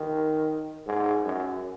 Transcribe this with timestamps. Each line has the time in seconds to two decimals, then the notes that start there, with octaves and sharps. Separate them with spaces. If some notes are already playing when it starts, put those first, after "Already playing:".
Already playing: D#3
0.87 G#2
1.25 F#2